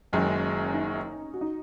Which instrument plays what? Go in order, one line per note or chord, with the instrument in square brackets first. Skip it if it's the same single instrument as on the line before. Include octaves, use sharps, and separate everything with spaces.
[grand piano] F#1 F#2 D#3 G#3 [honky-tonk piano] C#4
[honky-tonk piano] D#4
F#4
D#4